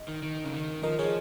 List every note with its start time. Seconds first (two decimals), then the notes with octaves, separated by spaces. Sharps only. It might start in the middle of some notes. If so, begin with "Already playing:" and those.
Already playing: D#5
0.08 D#3
0.23 D#3
0.45 C#3
0.54 D#3
0.83 F3 A#4 D#5
0.99 F3 G#4 C#5